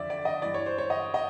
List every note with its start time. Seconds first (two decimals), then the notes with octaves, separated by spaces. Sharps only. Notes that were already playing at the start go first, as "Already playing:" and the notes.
Already playing: F2 D3 D5 E5
0.10 D5
0.25 D#5
0.42 G2 E3 D5
0.54 C#5
0.66 C5
0.78 C#5
0.90 D#5
1.14 D#5